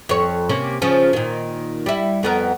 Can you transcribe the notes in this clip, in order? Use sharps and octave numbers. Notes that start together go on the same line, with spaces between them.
F2 C#5
C3 A#3 C#4
C#3 F3 C#4
A#2 D#3
G3 E4
F2 B3 A#4